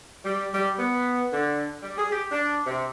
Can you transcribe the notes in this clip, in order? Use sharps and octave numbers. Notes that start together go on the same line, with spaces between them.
G3
G3
B3
D3
G3
G#4
G4
D4
C3